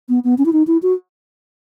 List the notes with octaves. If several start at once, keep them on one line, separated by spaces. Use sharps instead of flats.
B3
B3
C#4
E4
D#4
E4
F#4